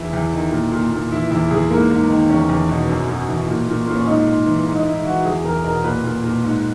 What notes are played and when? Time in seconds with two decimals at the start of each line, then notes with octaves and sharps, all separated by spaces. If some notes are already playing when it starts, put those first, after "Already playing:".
Already playing: E2 E4
0.13 E2
0.33 D#3
0.52 A#2
0.72 A#2
0.92 A#2
1.11 E3 E4
1.31 E2 E4
1.51 E2 G#4
1.70 G#2 A#3
1.90 G#2
2.10 D#3
2.29 E2 C#4
2.49 E2
2.69 B2
2.89 F#2
3.08 F#2
3.28 E3
3.48 A#2
3.68 A#2
3.87 A#2
3.95 C#4
4.07 G#2 D#4
4.27 G#2
4.46 E3
4.66 G#2
4.75 D#4
4.86 G#2 E4
5.05 E3 F#4
5.25 E2 G#4
5.45 E2 A#4
5.64 B2 A#4
5.84 A#2 B4
6.04 A#2
6.24 A#2
6.44 G#2